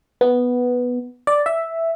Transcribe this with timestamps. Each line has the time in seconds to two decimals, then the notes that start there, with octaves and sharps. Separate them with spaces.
0.21 B3
1.27 D5
1.46 E5